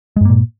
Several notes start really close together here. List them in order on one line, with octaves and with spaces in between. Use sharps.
G#3 G2 A#3 A#2